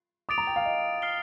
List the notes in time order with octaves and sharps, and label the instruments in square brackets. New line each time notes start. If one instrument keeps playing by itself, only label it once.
[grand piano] D6 [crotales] D#6 A6 D7 F7
[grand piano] A#5
G5
F5
D#5
[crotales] F6 C7 G7